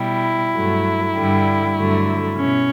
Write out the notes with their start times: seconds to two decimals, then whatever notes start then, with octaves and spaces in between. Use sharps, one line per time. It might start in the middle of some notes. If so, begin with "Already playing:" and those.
Already playing: B2 G3 E4
0.54 G2 F#3 A3
1.15 G2 D3 G3
1.77 G2 D3 F#3 A3
2.38 B2 C#4